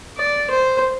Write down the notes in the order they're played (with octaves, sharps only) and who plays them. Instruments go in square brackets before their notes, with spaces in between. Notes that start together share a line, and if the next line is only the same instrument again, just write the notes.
[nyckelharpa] D5
C5